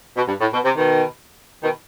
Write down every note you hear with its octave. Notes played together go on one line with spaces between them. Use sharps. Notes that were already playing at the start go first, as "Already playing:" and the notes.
B2
G2
A2
B2
C3
B2 D#3
B2 D#3